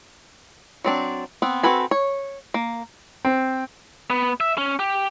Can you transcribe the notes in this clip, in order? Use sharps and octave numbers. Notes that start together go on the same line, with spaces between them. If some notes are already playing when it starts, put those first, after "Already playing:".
F#3 C4 D4
B3 C4
C4 F#4 A4 B4 G#5
C#5
A#3
C4
B3
E5
C#4
G4